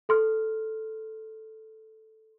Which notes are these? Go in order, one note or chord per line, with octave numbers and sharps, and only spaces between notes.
A4 C6 F6